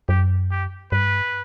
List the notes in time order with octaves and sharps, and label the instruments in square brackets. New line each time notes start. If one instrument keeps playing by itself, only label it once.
[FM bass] F#2 [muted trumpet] G4
[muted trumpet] G4
[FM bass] G2 [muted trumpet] B4